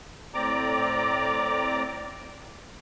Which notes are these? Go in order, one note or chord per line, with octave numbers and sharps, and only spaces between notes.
A2 C4 D5 A#5 D6